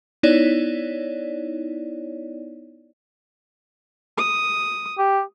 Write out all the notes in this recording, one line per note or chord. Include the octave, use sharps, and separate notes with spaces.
B3 D#4 E4 C#5 D5
D#6
G4